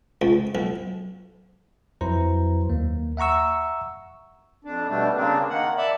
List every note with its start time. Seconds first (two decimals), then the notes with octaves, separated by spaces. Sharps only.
0.22 C#2
0.55 B1
2.01 F2 F#3 E4 B4 C5 A#5
2.69 D#2 A#3
3.17 E5 F#5 A#5 C#6 E6
4.65 F2 D4
4.89 B2 G3 A3 D4
5.16 C#3 A#3 C4 D4
5.49 D#3 A#3 F#5
5.78 D5 E5 A5 B5